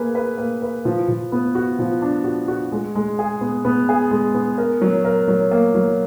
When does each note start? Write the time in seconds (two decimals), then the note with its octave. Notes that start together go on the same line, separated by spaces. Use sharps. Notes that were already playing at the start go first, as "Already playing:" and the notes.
Already playing: A#3 G#4 B4
0.15 B4
0.38 A#3
0.62 B4
0.85 F3
1.08 F3
1.32 B3
1.55 F#4
1.79 F3
2.02 D4
2.24 F#4
2.48 F#4
2.72 G#3
2.95 G#3
3.19 G#4
3.41 B3
3.65 B3
3.89 G#4
4.11 G#3
4.34 B3
4.58 A#4
4.81 F#3
5.05 A#4
5.28 F#3
5.51 A#3
5.75 F#3